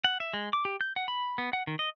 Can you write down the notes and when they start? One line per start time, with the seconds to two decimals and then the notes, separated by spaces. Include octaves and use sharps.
0.04 F#5
0.20 E5
0.34 G#3
0.53 D6
0.65 G4
0.81 G6
0.96 F#5
1.08 B5
1.38 B3
1.53 F#5
1.67 D#3
1.79 D#5